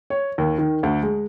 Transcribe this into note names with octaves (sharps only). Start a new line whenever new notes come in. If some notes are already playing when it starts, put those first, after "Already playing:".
C#5
D#2
D#3
D2
G#3